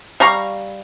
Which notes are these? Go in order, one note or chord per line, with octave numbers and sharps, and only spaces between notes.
G3 F5 A#5 C#6